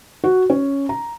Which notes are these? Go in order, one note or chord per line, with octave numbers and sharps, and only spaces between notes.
F#4
C#4
A#5